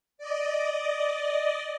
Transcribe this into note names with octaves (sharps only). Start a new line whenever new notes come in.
D5 D#5